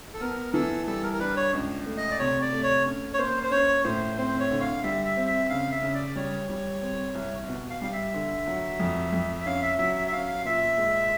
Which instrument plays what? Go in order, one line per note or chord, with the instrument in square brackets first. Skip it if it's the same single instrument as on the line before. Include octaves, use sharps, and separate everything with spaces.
[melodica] A4
[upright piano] B3 [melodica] A#4
[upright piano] E3 [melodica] A4
[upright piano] G3 [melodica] A4
[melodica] A#4
A#4
[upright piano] D4 [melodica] B4
[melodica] C#5
[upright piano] C#2
A3
[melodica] D#5
D5
[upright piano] C3 [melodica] C#5
[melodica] D5
[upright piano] A3
[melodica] C#5
[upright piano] C#4
[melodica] C#5
[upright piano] A#3 [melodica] C5
[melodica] C5
[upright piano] C#4 [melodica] C#5
[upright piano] A2 [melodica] C5
[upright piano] C4 [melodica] C5
[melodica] C#5
[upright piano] D3
[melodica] F5
[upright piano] G3 [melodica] E5
[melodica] E5
[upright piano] C4
[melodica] E5
[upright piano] C#3 [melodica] F5
[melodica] E5
[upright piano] C#3
[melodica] D5
[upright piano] G3 [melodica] C#5
[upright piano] G3
C4
C2
B2
[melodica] F5
[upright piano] G3 [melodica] F5
[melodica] E5
[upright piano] D3
F#3
F2
F2
[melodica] E5
[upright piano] C#4 [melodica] F5
[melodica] E5
[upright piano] F#3 [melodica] E5
[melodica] E5
E5
[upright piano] C#4 [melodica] F5
[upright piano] A#2 [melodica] E5
[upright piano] G#3